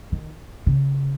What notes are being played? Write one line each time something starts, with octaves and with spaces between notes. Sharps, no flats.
D#3
C#3